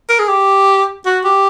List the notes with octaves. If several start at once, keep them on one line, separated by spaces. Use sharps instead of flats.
A#4
G#4
G4
F#4
G4